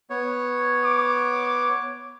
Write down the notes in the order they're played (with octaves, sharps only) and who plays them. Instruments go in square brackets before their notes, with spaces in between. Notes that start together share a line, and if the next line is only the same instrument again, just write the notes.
[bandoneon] B3 C#5
[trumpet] D6